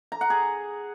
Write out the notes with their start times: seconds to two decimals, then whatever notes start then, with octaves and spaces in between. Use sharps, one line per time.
0.12 A#5
0.21 F#5
0.30 G#4